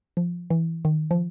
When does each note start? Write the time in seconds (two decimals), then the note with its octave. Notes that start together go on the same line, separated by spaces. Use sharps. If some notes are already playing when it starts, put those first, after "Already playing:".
0.17 F3
0.50 E3
0.85 D#3
1.11 F3